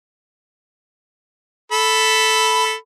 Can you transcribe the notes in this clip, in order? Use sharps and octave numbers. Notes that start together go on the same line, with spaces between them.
A4 B5